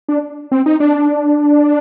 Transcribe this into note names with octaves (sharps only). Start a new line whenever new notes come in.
D4
C4
D#4
D4